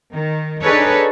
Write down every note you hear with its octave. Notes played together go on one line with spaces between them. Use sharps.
D#3
D4 D#4 G#4 A4 B4 C#5